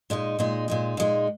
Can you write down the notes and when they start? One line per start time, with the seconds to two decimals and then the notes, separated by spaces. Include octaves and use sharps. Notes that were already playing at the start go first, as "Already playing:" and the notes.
0.10 A#2 G#3 D#4
0.39 A#2 G#3 D#4
0.68 A#2 G#3 D#4
0.97 A#2 G#3 D#4